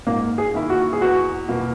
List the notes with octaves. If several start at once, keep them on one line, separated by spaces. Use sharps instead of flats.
G#2 A#3
G#4
D#3 A#3 E4
F#4
G#4
E2 F#4
B2 A#3